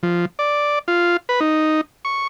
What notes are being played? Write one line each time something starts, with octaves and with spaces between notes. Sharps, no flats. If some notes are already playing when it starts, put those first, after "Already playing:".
F3
D5
F4
B4
D#4
C#6